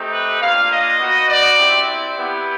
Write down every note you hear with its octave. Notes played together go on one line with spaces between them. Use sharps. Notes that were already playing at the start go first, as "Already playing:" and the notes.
Already playing: A3 C4 D#4 G4
B4
A#3 D4 F4 F5
D#5
B3 D#4 F#4
D5
C4 E4 G4
B3 E4 G4